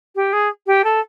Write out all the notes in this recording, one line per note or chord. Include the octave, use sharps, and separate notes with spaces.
G4
G#4
G4
A4